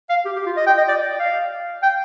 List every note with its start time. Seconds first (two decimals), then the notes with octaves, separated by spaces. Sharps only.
0.10 F5
0.25 G4
0.36 G4
0.46 F4
0.57 D#5
0.67 G5
0.78 D#5
0.89 D5
1.19 F5
1.83 G5